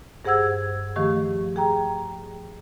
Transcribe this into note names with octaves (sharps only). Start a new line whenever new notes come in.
G2 G#4 C5 F#5 E6 G#6
D#3 F3 A3 G4 C#6
G#4 G5 A#5